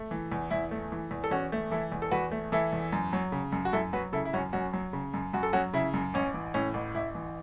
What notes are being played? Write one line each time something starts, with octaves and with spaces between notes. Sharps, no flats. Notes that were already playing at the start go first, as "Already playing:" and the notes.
Already playing: A3
E3
E2
E2 E4
A3
E3
E2
A4
E2 C#4 F#4
A3
E3 E4 A4
E2
A4
E2 F#4 B4
A3
E3 E4 A4
E2
F#2
F#3
C#3
F#2
F#4
F#2 E4 A4
F#3 F#4 B4
C#3 E4 A4
E4
F#2 C#4 F#4
F#2 C#4 F#4
F#3
C#3
F#2
F#2 F#4
A4
F#3 C#4 F#4
C#3 E4
F#2
A1 C#4
E3
A2 C#4
A1
A1 E4
E3